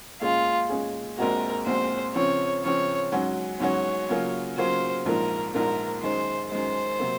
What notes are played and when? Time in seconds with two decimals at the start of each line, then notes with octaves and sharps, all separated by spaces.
0.21 A#2 G#3 C#4 F4 G#4
0.69 A#2 G#3 C#4 G#4
1.18 A#1 A#2 G#3 C4 F#4 A#4
1.66 A#1 A#2 G#3 C4 F#4 C5
2.15 C#3 F3 C4 C#5
2.63 C#3 F3 C4 C#5
3.12 G#2 F#3 C#4 F#4
3.60 G#2 F#3 C#4 F#4 C#5
4.09 C#3 F#3 A#3 C#4 F4
4.57 C#3 F#3 A#3 C#4 F4 C5
5.05 A#1 G#2 F3 A#3 A#4
5.54 A#1 G#2 F3 A#3 A#4
6.02 F#2 D#3 G#3 C5
6.51 F#2 D#3 G#3 C5
6.99 C3 F#3 A#3